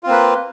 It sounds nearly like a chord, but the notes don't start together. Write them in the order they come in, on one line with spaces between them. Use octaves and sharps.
F4 C4 A#3 B4